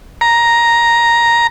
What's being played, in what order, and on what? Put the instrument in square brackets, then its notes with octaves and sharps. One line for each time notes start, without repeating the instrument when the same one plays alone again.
[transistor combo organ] A#5